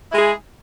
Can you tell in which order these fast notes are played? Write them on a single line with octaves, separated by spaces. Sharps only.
E4 G#3 G#4